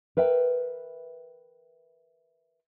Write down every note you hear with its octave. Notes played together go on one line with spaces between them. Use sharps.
A#4 B4 E5 G5